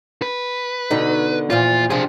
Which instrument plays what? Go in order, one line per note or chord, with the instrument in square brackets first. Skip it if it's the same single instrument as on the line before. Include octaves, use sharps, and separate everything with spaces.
[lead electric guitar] B4
[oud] B2 D3 D#4
[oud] E2 A#2 F3 [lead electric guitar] F4
[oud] C3 F3 [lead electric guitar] D4 G#4